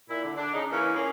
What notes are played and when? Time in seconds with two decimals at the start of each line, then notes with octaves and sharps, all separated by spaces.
0.10 A#2 E4
0.23 D3
0.37 D4
0.53 C#3 D#4
0.71 E3 A#3 C#4
0.95 A#3 C#4 F4 G#4